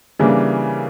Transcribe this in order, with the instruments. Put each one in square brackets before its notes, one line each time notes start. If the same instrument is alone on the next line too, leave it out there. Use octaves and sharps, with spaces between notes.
[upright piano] C#3 E3 G3 A#3 D4